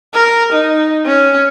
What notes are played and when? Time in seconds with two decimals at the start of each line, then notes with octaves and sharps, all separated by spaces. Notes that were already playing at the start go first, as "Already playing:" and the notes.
0.14 A#4
0.52 D#4
1.06 C#4